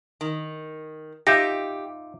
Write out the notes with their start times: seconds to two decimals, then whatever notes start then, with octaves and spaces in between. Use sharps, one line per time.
0.21 D#3
1.27 D#4 F4 G4 E5 G6 A#6